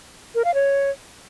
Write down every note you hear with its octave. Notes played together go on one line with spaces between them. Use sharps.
A#4
F5
C#5